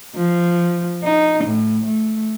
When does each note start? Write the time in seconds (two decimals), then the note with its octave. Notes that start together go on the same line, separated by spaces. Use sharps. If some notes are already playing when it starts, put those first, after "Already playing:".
0.15 F3
1.03 D#4
1.44 A2
1.85 A3